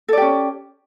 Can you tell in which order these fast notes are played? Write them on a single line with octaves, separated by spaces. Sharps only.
A4 D5 G4 C#4